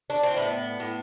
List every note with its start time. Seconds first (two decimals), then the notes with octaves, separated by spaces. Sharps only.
0.10 D4
0.23 C4
0.36 A2 B3
0.80 A2